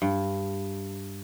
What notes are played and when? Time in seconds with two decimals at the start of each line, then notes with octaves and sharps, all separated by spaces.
0.02 G2